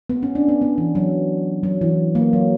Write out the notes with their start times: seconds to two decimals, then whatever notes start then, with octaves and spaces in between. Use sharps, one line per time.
0.10 B3
0.23 C#4
0.35 D4
0.48 B3
0.62 B3
0.78 E3
0.95 F#3
1.63 F#3
1.81 E3
2.15 A#3
2.33 F#3